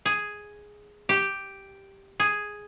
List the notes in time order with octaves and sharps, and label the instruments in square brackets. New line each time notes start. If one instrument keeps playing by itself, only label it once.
[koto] G#4
G4
G#4